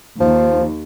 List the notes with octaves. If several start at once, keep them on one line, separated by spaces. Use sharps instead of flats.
D#2 F3